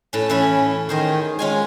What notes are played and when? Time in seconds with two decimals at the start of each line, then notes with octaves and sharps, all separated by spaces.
0.13 A2 C#4
0.29 E3 C#4 E4 B5
0.89 D#3 G#4 C5 D#5
1.39 G#3 C#4 F4 G#5